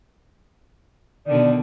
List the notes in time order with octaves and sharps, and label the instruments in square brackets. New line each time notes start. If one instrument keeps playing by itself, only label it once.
[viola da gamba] B2 D3 D#3 [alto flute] D5